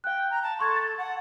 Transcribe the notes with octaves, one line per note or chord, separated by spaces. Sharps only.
F5 G5 F#6
A#5
A5
A4 C6 C#6 G#6
A6
F#5